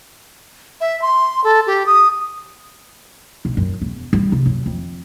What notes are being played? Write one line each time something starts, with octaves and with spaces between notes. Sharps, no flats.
E5
C6
A4
G4
D#6
B1
F#2
E1
G3
C3
F#2
F2